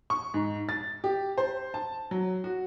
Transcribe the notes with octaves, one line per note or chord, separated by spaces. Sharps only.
C#6
G#2
A6
G4
C5
A5
F#3
F#4